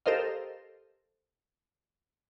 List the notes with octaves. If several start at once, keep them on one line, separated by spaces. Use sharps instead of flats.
G4 A4 A#4 C5 D#5 F5